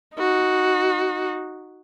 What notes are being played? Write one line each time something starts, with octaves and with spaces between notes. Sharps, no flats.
D#4 F#4